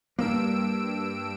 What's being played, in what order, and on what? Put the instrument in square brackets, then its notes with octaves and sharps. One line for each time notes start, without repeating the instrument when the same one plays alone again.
[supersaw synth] G2 E6 D7 [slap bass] A#3